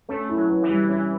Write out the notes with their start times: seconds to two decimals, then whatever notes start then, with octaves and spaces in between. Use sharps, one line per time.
0.09 A3 C#4
0.29 E4
0.36 F#3
0.49 B4
0.62 E3
0.69 G3
0.89 E3 C#4